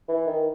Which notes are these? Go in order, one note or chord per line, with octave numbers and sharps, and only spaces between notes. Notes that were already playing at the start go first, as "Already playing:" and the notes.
E3
D#3